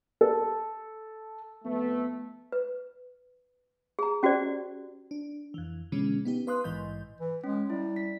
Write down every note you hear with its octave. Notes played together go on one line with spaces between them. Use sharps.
A4
F2 A3 B3
B4
G#4 A#5
C#4 F#4 G4 C5 D5
D4
F2 E3
B2 D3 E3 F3 G#3 C#4
B3 D#4 G4
B4 F5 C6 D#6 F#6
A#1 G#2 E3 D#5 C6 G6
E3
G#3 C#4
G3 E4
B6